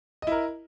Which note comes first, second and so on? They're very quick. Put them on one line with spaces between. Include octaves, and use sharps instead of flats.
D#5 E4 A#4